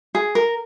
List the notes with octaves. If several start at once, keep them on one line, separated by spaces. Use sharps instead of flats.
G#4
A#4